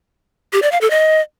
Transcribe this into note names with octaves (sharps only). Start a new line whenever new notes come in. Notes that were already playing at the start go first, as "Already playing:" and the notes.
G4
D5
F5
A4
D#5